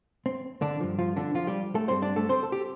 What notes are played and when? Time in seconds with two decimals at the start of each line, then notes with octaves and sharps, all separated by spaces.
0.26 C4
0.62 D3 D4
0.80 G2 F3
0.99 F3 F4
1.16 D3 D4
1.35 F3 F4
1.47 G3 G4
1.75 A3 A4
1.88 G2 G3 C4 C5
2.02 D4 D5
2.16 A3 A4
2.29 C4 C5
2.43 A4
2.52 G4